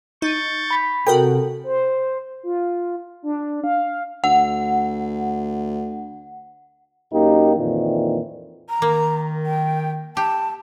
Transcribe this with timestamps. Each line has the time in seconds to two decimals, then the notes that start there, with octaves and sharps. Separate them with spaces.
0.22 D#4 C#6 G6 A6
0.70 B5 B6
1.07 C3 F#4 A4 A#4 G5
1.64 C5
2.43 F4
3.23 D4
3.64 F5
4.24 D2 F#5
7.13 F#2 A#3 D#4 G4
7.57 F2 A#2 D#3 E3
8.69 A#5
8.82 D#3 A#3
9.46 G5
10.17 G4 A5